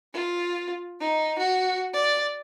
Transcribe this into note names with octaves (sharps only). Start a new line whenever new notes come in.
F4
D#4
F#4
D5